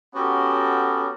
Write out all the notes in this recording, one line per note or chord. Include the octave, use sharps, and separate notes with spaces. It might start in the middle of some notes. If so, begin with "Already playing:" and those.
B3 C#4 F#4 G4 A4 A#4